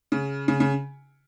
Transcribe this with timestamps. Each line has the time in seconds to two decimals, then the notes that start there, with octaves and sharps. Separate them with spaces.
0.12 C#3
0.48 C#3
0.60 C#3